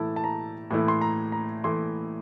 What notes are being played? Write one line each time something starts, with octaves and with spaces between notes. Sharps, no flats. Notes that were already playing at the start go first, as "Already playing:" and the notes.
Already playing: A2 E3 A3 E4 A5
A5
A#5
A2 E3 A3 E4
C6
A#5
A#5
A2 E3 A3 E4 C6